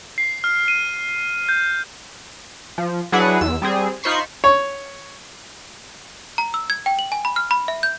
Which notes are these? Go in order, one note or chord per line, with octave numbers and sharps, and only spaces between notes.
C7
F6
D#7
G6
F3
F#3 D4 E4 G#4 B4 F#5
E2 E6
G3 C4 G#4
D#4 F4 C5 B5 C#6 C7
C#5
A#5
E6
G#6
G5
F#7
G#5
B5
F6
B5
E5
G6